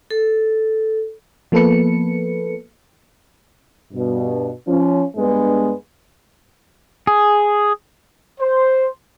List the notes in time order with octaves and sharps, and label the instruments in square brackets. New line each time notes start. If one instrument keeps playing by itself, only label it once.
[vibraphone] A4
[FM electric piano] F3 A#3 B3 A4 B4 C#7
[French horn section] G2 B2
F3 C#4
G2 G#3 B3 D4 B4
[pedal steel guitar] G#4
[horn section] C5